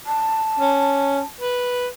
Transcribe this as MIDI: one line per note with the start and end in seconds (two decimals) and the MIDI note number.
0.06 1.24 81
0.60 1.20 61
1.41 1.88 71